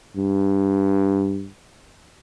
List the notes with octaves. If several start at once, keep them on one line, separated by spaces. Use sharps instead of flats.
G2